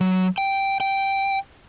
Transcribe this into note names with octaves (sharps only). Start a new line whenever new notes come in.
F#3
G5
G5